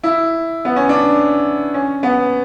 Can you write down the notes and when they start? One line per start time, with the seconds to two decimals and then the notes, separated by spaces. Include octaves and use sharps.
0.03 E4
0.65 B3
0.76 C#4
0.89 D4
1.74 C#4
2.03 B3